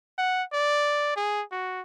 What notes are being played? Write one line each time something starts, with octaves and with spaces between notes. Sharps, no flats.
F#5
D5
G#4
F#4